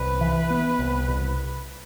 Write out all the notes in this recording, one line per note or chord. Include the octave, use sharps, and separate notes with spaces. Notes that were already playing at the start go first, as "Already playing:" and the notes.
Already playing: C2 B4
E3
B3
C2
C2